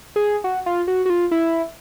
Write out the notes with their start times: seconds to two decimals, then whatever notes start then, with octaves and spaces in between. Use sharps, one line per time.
0.16 G#4
0.44 F#4
0.66 F4
0.88 F#4
1.06 F#4
1.10 F4
1.31 E4